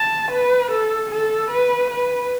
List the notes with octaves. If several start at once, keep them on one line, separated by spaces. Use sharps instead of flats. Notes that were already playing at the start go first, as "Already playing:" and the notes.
Already playing: A5
B4
A4
A4
B4
B4